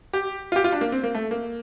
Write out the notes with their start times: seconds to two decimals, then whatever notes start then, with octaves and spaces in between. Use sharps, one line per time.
0.13 G4
0.52 F4
0.56 G4
0.64 F4
0.72 D4
0.81 A#3
0.92 C4
1.03 A#3
1.15 A3
1.31 A#3